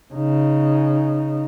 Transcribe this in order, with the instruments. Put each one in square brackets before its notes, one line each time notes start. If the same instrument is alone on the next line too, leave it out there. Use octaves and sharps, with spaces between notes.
[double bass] C#3 D#4